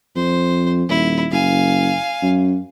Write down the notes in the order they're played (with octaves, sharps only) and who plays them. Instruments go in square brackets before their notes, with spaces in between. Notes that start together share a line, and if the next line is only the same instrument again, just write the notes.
[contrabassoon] F2 [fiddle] C5
[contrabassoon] D#1 [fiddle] E4
[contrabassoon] F#1 [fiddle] F5 G#5
[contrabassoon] F#2